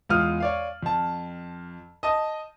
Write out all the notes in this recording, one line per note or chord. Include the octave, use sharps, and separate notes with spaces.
E2 G#3 F4 D#6 F6 D#7
C#5 D5 F5
F2 A5
D#5 A5 D#6